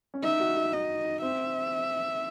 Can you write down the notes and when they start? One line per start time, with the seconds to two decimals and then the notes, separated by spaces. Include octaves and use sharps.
0.14 C#4
0.24 D#4 E5
0.40 F#4
0.57 F#4
0.73 D#4 D#5
1.22 C4 E5